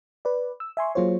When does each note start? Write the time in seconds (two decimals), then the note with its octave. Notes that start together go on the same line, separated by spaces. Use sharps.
0.25 B4 D5
0.60 E6
0.77 E5 G#5 C6 C#6
0.95 F#3 A#3 F4 G#4 C5 C#5